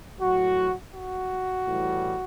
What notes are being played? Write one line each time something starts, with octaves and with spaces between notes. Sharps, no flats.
A2 F#3 F#4
F#4
A2 E3 G3